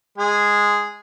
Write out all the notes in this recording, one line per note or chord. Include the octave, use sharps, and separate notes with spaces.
G#3 G#4